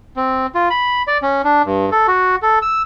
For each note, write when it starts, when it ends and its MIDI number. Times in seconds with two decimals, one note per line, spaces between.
0.16 0.46 60
0.55 0.69 65
0.70 1.03 83
1.08 1.18 74
1.22 1.42 61
1.44 1.62 62
1.65 1.89 43
1.92 2.07 69
2.08 2.36 66
2.42 2.59 69
2.62 2.82 88